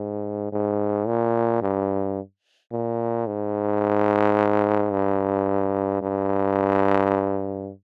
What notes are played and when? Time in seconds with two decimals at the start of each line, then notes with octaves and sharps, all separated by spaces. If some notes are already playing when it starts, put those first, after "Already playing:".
Already playing: G#2
0.52 G#2
1.07 A#2
1.62 G2
2.72 A#2
3.27 G#2
4.92 G2
6.02 G2